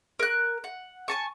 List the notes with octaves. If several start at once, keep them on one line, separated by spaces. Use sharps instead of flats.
A#4 F#6
F#5
G#5 A5 C#6